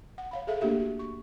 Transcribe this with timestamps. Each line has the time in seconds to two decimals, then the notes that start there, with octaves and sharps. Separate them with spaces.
0.18 F#5
0.31 C#5 F5 B5
0.47 G#4 A4 E5 F5
0.61 A3 A#3 D4 G4 E5
0.80 F#4
0.99 C#6